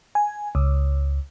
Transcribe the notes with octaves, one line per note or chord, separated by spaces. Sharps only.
G#5
C#2